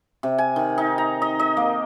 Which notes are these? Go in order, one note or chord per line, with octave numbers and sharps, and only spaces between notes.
C3
G#5
D#3
D#4
A#5
D#5
D#5
A#3